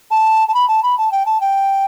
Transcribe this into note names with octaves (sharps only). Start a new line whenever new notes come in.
A5
A5
B5
A5
B5
A5
G5
A5
G5